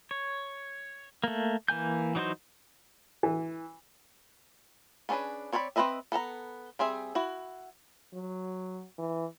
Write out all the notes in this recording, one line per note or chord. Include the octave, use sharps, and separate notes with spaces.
C#5
A3 A#3
E3 A#3 G#5 G6
E3 F#3 D#4 F#4 C5
E3
B3 C#4 D4 G#4 B4
C4 C#5 D5 F5 B5
C4 A4 B4 D#5 E5
B3 A4 A5 A#5
G3 C4 G#4 E5
E4 F#4
F#3
E3